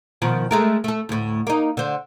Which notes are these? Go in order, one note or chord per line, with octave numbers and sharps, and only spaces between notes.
B2 D#3 F3
G#3 A3 A#4
A3 A4
D2 A2
A#3 D#4
D3 C5